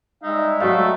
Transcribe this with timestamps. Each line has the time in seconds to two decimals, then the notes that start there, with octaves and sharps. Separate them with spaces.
0.23 G3 G#3 D#4 E5
0.60 F#3 A3 F#4 F5